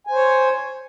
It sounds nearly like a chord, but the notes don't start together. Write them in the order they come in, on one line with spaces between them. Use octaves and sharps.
G#5 C5 C#5